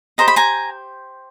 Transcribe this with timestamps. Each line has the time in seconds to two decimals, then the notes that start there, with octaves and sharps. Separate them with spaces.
0.18 G4 C5 D#5 A#5
0.28 B5
0.36 G#5 A#5